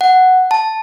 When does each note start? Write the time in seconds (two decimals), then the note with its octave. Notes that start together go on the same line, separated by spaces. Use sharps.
0.01 F#5
0.51 A5